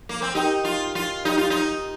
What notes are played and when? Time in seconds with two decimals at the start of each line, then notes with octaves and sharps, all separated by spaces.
0.09 A#3
0.22 C4
0.34 D#4 G4 A#4 D#5 G5
0.65 F4
0.95 F4
1.25 D#4 G4 A#4 D#5 G5
1.38 F4
1.50 D#4